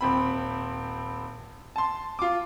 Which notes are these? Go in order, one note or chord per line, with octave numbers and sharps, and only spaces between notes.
D#1 C4 B5
A5 C6
F4 D6